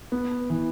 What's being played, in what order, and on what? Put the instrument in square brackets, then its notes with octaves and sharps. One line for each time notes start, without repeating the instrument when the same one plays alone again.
[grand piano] B3
E3